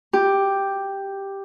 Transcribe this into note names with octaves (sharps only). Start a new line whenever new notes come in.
G4